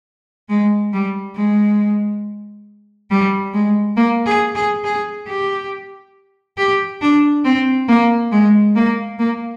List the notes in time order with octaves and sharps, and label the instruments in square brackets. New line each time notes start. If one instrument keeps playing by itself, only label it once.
[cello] G#3
G3
G#3
G3
G#3
A#3
G#4
G#4
G#4
G4
G4
D4
C4
A#3
G#3
A#3
A#3